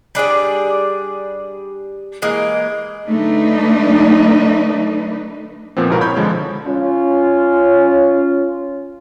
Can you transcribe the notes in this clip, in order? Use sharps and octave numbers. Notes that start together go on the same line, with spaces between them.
G3 D4 G#4 D5
E3 G#3 A#3
D3 F#3 A3 D4 D#4 B4
A#2 F3 B3 C4
G#1 C#2 B2 E4 A#4
C#5 B5 G6
D3 F3 G#3
C#4 F4